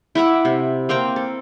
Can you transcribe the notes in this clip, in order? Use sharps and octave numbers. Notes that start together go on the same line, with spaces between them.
E4 E5 F#5 D6
C3
A#3 C4 G5 A#5
A4